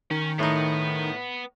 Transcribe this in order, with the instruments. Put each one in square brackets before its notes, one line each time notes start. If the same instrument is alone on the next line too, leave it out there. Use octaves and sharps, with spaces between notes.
[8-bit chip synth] D#3 [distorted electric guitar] C#4
[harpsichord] A2 D#4 [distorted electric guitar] B3